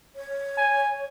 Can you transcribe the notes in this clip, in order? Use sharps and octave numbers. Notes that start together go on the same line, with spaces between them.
C#5
G#5